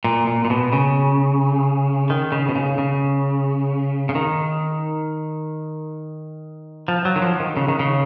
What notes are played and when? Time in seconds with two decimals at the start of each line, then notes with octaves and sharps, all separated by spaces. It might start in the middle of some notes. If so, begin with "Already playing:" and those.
0.04 A#2
0.27 A#2
0.45 A#2
0.50 B2
0.73 C#3
2.10 D#3
2.32 C#3
2.49 B2
2.55 C#3
2.78 C#3
4.09 C#3
4.15 D#3
6.88 F3
7.05 F#3
7.16 D#3
7.22 F3
7.40 D#3
7.57 C#3
7.68 D#3
7.79 C#3